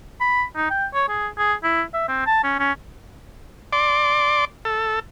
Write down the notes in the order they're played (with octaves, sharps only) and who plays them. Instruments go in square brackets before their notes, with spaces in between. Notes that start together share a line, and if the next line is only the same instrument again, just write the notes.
[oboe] B5
D#4
G5
C#5
G#4
G#4
E4
E5
C4
A5
C#4
C#4
[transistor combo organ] D5 C6 D6
A4